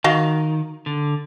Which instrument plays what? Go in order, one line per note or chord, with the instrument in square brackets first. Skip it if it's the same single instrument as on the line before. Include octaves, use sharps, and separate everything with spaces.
[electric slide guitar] D#3 [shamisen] F#4 D#5 F5
[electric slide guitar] D3